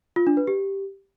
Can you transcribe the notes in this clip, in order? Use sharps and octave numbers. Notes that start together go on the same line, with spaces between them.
F4
D4
B4
G4